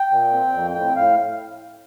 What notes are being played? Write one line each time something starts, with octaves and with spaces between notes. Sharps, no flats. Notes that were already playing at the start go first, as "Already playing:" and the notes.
Already playing: G5
A#2
C4
F2
A2 G5
A2 F5